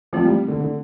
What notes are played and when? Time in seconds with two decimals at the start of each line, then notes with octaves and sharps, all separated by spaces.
0.13 E3 F3 A3 C4
0.25 G3
0.48 D3
0.60 D3